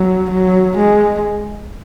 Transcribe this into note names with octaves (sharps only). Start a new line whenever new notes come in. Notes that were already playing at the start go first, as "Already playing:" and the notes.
Already playing: F#3
F#3
G#3